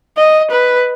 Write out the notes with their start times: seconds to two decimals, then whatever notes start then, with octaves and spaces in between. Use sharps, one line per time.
0.18 D#5
0.51 B4